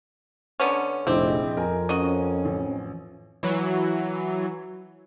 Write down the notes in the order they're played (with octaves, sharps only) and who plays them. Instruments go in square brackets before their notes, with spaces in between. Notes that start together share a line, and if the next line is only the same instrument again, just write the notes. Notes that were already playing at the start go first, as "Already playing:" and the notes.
[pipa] D3 B3 C#4
[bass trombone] F1 [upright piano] A#1 E4 D6 [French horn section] F3 G#4 D#5 [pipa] C4
[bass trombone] F2 [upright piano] A#4 G#5
[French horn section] C#4 [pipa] F#4 D#5
[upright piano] A1
[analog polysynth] E3 F#3